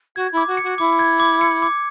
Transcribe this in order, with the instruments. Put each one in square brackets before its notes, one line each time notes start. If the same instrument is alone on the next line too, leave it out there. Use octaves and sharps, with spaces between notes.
[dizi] F#4 [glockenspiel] G#6
[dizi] E4
[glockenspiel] D6
[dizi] F#4
[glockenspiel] C#7
[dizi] F#4
[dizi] E4 [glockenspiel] D6
[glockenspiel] G#6
D6
C#7
D6